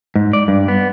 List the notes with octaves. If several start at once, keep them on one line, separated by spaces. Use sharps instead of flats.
G#2
D5
G2
B3